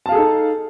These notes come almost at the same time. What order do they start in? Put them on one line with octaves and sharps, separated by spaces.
A5 F5 G#4 A4 D#4